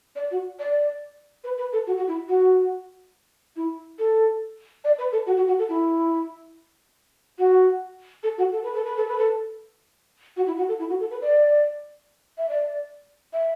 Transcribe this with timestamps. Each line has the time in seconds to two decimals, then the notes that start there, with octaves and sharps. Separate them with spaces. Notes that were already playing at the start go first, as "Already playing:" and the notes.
0.16 D5
0.31 F#4
0.59 D5
1.44 B4
1.58 B4
1.73 A4
1.87 F#4
1.97 F#4
2.08 E4
2.28 F#4
3.56 E4
3.99 A4
4.84 D5
4.98 B4
5.12 A4
5.26 F#4
5.36 F#4
5.47 F#4
5.59 A4
5.69 E4
7.38 F#4
8.23 A4
8.38 F#4
8.52 A4
8.63 B4
8.74 A4
8.85 B4
8.97 A4
9.07 B4
9.18 A4
10.37 F#4
10.47 E4
10.57 F#4
10.68 A4
10.79 E4
10.89 F#4
11.00 A4
11.11 B4
11.22 D5
12.38 E5
12.49 D5
13.33 E5